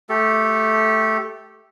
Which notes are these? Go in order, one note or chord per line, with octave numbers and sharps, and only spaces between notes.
A3 G4 A4